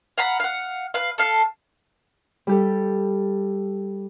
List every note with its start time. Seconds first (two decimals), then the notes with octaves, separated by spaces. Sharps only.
0.18 F5 F#5 A#5 B5
0.40 F5 F#5
0.94 B4 F5
1.18 A4 F5
2.47 G3 G4 A4